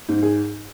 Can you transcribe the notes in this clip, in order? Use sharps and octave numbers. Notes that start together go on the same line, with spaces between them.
G#2
G#4